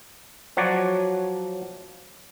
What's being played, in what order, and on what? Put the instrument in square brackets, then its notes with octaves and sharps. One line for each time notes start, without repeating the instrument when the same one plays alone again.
[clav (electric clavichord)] F3 F#3 F#4 C#5 D5